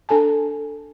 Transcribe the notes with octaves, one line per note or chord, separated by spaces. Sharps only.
D4 A4 G#5 A5